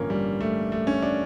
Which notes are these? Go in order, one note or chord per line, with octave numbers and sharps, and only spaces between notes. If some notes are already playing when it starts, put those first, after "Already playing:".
Already playing: A1 G2 D3 F3 A#3 C#4
G3
A3
A3
C#4
D4